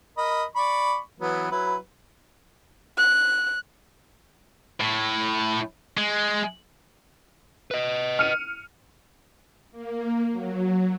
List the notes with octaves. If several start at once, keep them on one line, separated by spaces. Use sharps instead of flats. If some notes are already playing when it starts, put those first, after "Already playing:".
A#4 D#5 B5
D5 B5 C#6
E3 F#3 B3
F#3 E4 B4
F#6
A2
G#3
B4 D#5
F6 C#7 D#7
A#3
F#3